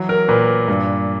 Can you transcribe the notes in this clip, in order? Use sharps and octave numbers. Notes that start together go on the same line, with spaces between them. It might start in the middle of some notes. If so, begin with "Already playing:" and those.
Already playing: E3 F#3
A#4
A#2 B4
G2